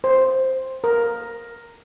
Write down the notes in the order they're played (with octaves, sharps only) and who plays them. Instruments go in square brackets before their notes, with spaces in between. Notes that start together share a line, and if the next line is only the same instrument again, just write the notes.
[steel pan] C5
A#4